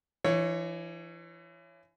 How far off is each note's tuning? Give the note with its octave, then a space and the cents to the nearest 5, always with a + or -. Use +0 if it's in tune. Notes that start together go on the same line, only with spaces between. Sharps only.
E3 +35 D#4 -25 C#5 +0